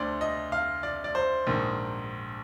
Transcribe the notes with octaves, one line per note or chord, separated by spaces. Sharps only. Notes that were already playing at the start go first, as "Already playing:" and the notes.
Already playing: D2 D3 C5 D5
D#5
F5
D5
D5
C5
A#1 G#2 D#3